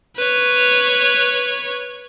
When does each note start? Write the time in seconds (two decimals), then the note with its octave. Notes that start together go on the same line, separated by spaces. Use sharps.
0.17 B4 C#5